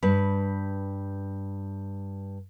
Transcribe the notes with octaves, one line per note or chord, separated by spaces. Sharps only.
G2 B4